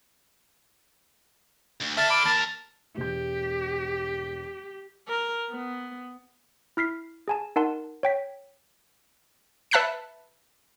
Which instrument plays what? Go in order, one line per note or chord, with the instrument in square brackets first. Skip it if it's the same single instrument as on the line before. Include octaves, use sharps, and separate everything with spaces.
[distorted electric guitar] D2
[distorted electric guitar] D3 A4 [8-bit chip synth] E5 F6 [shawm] A5
[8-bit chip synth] B5 F6 [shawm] D6
[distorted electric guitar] D#2 A#4 [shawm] A5
[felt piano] E1 G6 [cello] G4
[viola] A#4
B3
[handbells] E4 F6 B6 C7
G#4 G#5 A5
D#4 A#4 F#5 A5 C6
C#5 G5 B6
[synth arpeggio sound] B4 E5 A5 F#6 B6 C#7